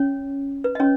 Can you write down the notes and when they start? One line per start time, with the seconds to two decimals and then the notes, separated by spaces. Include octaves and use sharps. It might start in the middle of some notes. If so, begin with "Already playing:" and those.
Already playing: C#4 C#5
0.64 B4
0.75 D#5
0.80 C#4 C#5